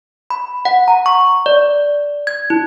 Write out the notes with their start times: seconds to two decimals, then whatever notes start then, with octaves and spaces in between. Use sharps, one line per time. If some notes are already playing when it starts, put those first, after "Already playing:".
0.30 B5
0.65 F#5
0.88 A#5
1.06 C#6
1.46 D5
2.27 G#6
2.50 E4